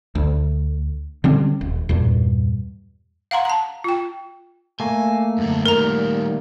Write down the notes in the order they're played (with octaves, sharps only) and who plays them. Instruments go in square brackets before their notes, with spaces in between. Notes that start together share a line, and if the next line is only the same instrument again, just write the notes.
[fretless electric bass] D2
D3 G3 C4 C#4
D#1
E2 G2 A#2
[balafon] F5 F#5 A#5 C6
A5 A#5
F4 G5
[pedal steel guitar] A3 A#3 [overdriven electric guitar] G#5
[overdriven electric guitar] F#2 D3
[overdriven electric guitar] D#3 G3 [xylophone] A#4 A#5